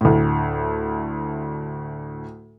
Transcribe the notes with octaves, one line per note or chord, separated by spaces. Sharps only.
D2 A2